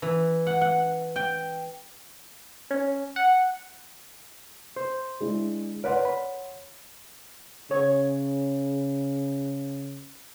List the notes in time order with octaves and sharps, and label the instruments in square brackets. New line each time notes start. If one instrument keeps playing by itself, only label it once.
[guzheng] E3
F#5
F#5
G5
[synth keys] C#4
F#5
[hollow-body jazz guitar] C5
[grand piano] G#3 D4 E4
[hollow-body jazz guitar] A#4 B4 D5 [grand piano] C#5 F#5 C6
[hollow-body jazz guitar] B5
[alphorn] C#3 [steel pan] C#5